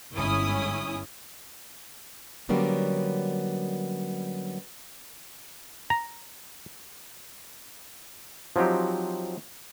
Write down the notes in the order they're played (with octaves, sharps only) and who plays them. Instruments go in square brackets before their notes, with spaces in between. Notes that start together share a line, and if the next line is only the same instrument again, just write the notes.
[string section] G1 G#2 C#4 E4 G#5 D#6
[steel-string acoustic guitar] D3 F#3 G3 A#3 B3 C#4
[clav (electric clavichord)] A#5
F3 F#3 C4 D#4 G4